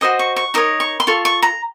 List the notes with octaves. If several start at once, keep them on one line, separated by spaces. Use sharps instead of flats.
F#4 C5 D#5 D#6
C#6
C#6
D#4 A#4 C#5 D#6
C#6
C6
F4 A4 C#6
C#6
A#5